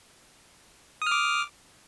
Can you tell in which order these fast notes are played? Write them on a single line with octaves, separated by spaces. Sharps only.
D#6 F6 D6